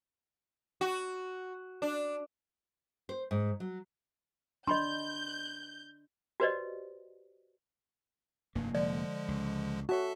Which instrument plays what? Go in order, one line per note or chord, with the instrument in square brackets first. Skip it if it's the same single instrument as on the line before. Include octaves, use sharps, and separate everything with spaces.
[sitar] F#4
D4
[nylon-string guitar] C5
G#2
F#3
[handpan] D4 [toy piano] D#5 B5 C6 [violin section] G6
[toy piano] F#4 G4 B4 C5 D5 D#5
[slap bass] F1 A#3 [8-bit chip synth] G2
[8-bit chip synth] D3 F3 G#3 [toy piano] D5
[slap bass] C#2
[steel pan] F#4 C#5 [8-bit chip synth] A4 E5 A5